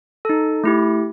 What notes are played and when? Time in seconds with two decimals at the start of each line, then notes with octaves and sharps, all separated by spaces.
0.25 D#4 A4
0.64 A3 E4 G4